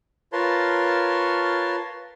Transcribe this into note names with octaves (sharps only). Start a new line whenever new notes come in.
F4 A#4 B4 C#5 A5 C6